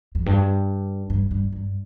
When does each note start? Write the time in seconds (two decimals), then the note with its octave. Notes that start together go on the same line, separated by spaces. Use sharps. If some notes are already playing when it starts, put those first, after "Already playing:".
0.15 F2
0.26 G2
1.10 G2
1.31 G2
1.52 G2